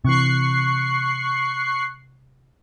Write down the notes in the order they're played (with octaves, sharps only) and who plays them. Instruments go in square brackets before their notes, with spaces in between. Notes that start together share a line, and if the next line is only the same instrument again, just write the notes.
[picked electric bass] C3 E3 [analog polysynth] C#6 F#6 C7